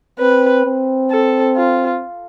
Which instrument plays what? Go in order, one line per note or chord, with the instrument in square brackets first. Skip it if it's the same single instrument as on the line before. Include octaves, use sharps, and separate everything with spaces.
[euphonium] C4 [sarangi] B4
[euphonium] C4
[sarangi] A4
F4